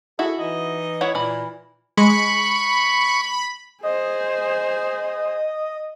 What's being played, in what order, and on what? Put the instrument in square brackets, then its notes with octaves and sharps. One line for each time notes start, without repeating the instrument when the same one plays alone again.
[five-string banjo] E4 F#4 [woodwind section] G#4 A4
[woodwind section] E3 D#4 D#5
[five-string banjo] E4 C#5 F#5
[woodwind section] A#2 [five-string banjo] E3 B5
[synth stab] G#3 [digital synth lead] B5 [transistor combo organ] C#6
[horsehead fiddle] G#4 C5 [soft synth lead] D#5